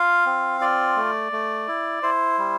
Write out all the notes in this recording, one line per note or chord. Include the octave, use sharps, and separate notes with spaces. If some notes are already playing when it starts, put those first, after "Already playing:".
Already playing: F4 F5
C4
F4 D5
A3
A3
E4
E4 C5
G3